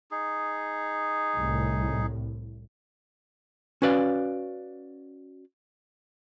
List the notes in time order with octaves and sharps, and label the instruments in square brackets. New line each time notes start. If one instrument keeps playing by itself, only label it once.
[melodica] D#4 G#4
[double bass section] C2 A2
[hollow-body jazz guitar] C#4 F#4 B4 D5 F5